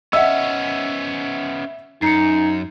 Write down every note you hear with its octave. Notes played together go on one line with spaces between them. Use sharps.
B3 C#4 D#5 E5 F#5 E6
F#2 D#4 C7 C#7